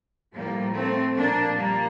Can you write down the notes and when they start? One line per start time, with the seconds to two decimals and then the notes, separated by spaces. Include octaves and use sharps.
0.33 A2 F3 G3 A#3
0.76 A3 C4
1.16 A#2 F3 A#3 D4
1.58 G3 A#3